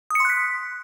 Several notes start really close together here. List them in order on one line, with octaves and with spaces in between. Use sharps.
D#6 C#7 C6 F#6 B6